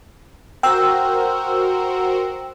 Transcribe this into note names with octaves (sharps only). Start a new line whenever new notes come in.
F#4 A#4 C5 G5 E6